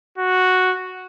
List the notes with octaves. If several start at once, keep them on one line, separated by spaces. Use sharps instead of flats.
F#4